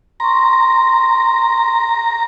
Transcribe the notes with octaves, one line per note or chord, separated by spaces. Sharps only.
A#5 C6 C#6